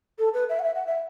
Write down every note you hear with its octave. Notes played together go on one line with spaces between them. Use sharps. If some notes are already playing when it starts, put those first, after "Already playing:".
A4
B4
E5
F#5
E5
F#5
E5